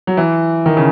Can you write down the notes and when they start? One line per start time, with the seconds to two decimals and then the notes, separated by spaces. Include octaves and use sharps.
0.07 F#3
0.17 E3
0.66 D#3
0.77 C#3